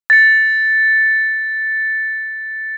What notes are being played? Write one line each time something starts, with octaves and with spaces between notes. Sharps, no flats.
A6 C#7